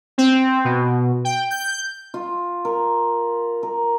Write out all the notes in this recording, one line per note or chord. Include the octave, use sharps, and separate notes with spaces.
C4
B2
G5
G6
F4
A#4
A#4